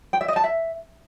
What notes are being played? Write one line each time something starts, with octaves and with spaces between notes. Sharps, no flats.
G5
E5
D#5
A5
E5